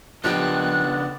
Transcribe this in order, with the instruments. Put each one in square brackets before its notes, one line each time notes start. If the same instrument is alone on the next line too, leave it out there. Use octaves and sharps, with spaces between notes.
[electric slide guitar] C#3 D4 D#5 [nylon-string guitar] F3 G4 [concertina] B3 D5 [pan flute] F#6